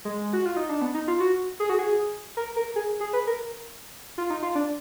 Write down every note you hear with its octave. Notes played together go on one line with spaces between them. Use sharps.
G#3
F#4
F4
D#4
D4
B3
D#4
F4
F#4
G#4
F#4
G#4
A#4
A#4
G#4
G#4
B4
A#4
F4
D#4
F4
D4